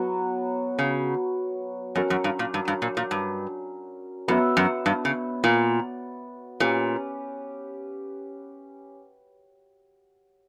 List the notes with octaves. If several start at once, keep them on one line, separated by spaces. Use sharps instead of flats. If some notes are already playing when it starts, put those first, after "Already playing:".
Already playing: F#3 B3 F#4
C#3
F#2 C#4 F#4 A#4
F#2
G2
A#2
G2
G2
A#2
A#2
G2
F#2 B3 F#4 C#5 E5
F#2
G2
C#3
A#2
A#2 C#4 G4 B4